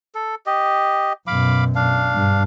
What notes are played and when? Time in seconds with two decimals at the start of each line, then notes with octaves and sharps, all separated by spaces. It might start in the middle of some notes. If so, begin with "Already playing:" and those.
0.15 A4
0.46 G4 D#5
1.27 F#2 B2 F5 B5 D6
1.75 D4 F5
2.14 G2